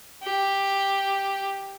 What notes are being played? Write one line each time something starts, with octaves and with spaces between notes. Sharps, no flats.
G4